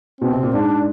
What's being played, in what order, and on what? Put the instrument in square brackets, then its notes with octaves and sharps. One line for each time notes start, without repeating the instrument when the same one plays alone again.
[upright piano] B2 [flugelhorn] C4
[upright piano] C3
A#2
[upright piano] G#2 [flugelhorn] D4